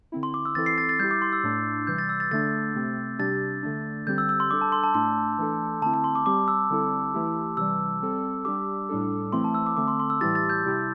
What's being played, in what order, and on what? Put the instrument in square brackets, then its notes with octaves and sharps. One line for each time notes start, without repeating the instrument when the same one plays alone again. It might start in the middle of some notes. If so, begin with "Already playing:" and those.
[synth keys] D3 C4 E4
[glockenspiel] C6
D6
E6
[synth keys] E3 C4 E4 A4 [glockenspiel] A6
[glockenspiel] C7
A6
A6
[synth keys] G3 E4 G4 [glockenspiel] G6
[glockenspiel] D6
C6
E6
[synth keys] A2 A3 D4
[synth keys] C3 E3 G3 [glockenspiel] G6
[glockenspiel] A6
E6
A6
[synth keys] D3 A3 D4 [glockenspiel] A6
[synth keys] C3 A3 C4
[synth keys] C3 G3 D4 G4 [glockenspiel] A6
[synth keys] D3 A3 D4
[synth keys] D3 G3 C4 G4 [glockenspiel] G6
[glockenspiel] E6
E6
C6
[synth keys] G3 D4 A4 [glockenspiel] D6
[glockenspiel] A5
C6
A5
[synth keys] A2 A3 D4 [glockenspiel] C6
[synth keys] E3 A3 D4 A4
[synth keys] D3 A3 C4 E4 [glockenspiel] A5
[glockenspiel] A5
C6
D6
[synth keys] G3 C4 G4 [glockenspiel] D6
[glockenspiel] E6
[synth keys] D3 G3 C4 E4 A4
E3 A3 E4 G4
[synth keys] C3 E3 G3 [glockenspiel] E6
[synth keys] G3 C4 A4
[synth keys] G3 D4 G4 [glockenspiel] D6
[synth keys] A2 G3 D4 A4
[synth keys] E3 A3 C4 E4 [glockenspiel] C6
[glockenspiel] A5
E6
D6
[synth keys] D3 A3 C4 [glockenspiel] D6
[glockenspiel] C6
C6
E6
[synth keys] A2 E3 G3 E4 G4 [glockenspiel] A6
[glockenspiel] A6
G6
[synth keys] C3 G3 E4 G4